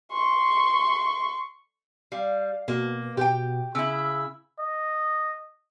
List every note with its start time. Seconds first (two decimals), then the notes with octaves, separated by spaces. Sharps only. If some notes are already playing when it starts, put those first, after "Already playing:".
0.13 C6 C#6
2.12 G3 F5
2.68 B2 A#3
3.17 B2 G4 G5
3.75 C#3 E4 E6
4.59 D#5